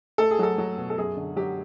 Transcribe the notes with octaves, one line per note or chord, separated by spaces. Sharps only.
A3 A4
G#4
F#3 A4
F#3
B2
A4
F#2 G#4
D3
F#3 G4